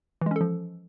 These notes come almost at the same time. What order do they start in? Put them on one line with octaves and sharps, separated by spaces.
E3 G#3 C#4 A4 F3